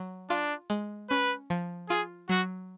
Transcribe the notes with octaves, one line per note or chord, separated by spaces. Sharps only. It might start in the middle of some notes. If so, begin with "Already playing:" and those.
Already playing: F#3
D4 F4
G#3
C#4 B4
F3
F4 G#4
F#3 F#4